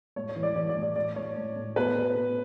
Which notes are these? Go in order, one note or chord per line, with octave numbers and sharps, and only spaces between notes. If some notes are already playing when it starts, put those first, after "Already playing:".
A2 C#5
C#5
E3
D5
E3 D5
D5
A2
D5
A2 D5
A2 C#5
A2
A2
B2 B4
B2
B2